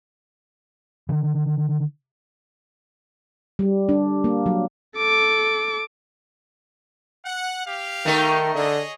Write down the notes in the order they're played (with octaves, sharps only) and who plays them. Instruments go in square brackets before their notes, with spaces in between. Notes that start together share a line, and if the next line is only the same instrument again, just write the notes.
[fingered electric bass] D3 D#3
[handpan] G3
D4
A#3
F#3
[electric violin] A4 D6
[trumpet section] F#5
G4 F5
[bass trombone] D#3 [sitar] A3 D#4 A#4
[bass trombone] D3 [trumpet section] G#4 C#5 D#5